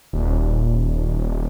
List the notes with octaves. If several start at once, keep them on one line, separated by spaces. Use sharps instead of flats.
D#1